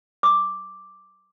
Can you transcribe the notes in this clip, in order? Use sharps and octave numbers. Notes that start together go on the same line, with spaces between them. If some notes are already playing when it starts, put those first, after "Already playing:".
D6